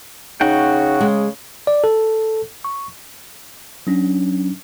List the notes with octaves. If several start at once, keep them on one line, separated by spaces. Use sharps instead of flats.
C#3 D#4 F#4 F#5 G5
G#3
D5
A4
C#6
F#3 C#4 D4